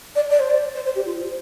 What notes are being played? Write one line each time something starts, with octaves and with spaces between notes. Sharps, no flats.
D5
D5
C5
D5
C5
C5
G4
F4
C5